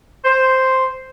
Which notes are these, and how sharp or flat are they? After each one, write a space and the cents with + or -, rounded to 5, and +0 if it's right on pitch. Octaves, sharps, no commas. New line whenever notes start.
C5 +0 C6 +0